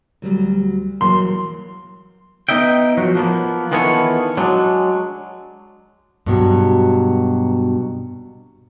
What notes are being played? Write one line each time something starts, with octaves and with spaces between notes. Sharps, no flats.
D2 F#3 G3
E3 F#3 A#3 C6
B3 D#4 D#5 E5 G5
F3 F#3 F#4
F3 A#3 B3
D#3 E3 B3 F4 A4 C#5
F#3 G#3 D4
G2 B2 F#3